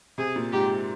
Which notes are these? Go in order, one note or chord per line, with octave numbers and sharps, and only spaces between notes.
C3 G#4
A#2
G#2 G4